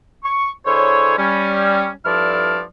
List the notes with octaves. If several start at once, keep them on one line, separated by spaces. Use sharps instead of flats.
C#6
D3 E4 G#4 C5 C#5
G3 C#4
G2 F3 E4 A4 D5 F6